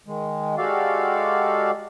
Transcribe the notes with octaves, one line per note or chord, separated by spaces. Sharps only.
D#3 G#3
G#3 F#4 G4 A4 D5 F5